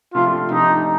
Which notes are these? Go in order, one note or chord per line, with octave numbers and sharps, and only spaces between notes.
C3 F3 A3 D4 F4 G4
C3 F3 A3 D4 D#4 G4